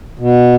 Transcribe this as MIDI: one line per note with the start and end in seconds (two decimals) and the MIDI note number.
0.19 0.55 47